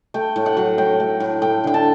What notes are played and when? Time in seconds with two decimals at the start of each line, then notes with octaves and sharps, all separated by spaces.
0.14 A3 G5
0.36 A2
0.46 F#5
0.57 F#3
0.78 A2 G5
1.00 A3
1.20 A2
1.42 A3 G5
1.64 D3 G5
1.74 A5